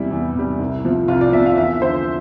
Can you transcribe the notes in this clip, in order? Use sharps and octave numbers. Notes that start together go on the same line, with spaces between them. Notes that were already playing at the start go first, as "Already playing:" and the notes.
Already playing: E2 C3 G3 E4
E2
C3 G3
C2
C3 F3
C2 F4
D5
C3 F3 E5
F5
E2 E5
D3 F3 C5